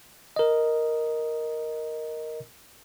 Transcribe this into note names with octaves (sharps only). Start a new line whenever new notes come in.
A#4 D#5